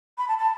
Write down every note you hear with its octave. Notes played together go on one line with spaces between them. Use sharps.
B5
A5
A5